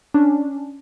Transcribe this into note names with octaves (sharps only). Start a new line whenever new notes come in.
C#4 D4